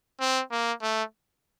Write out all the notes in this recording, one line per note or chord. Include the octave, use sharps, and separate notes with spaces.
C4
A#3
A3